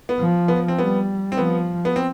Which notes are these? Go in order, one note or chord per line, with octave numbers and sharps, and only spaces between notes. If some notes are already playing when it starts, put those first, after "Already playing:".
B3
F3
B3
C4
G3 B3
C4
F3 B3
B3
C4